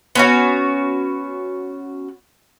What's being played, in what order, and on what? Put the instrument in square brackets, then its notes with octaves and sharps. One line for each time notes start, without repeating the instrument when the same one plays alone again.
[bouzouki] B3 C#4 F#4